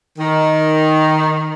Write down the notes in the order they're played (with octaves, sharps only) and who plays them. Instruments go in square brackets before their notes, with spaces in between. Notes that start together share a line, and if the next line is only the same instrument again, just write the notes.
[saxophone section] D#3